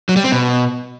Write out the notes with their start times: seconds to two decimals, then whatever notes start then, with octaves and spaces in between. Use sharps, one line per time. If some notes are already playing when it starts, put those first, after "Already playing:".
0.09 F#3
0.16 G3
0.24 C4
0.32 B2